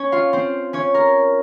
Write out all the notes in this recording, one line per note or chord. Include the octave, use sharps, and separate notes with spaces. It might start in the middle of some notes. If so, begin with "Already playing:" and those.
Already playing: C#4 C#5
F4 F5
C4 C5
C#4 C#5
A#4